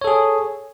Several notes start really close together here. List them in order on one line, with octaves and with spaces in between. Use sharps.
C#5 A4 G#4